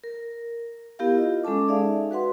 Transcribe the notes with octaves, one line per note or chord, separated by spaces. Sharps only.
A#4
B3 E4 G4 A#4 F5
E4 F4 D#5
G#3 C#4 A4 A5 D6
D#4 G#4 D5 E5 F5
F#4 B4 F#5 C6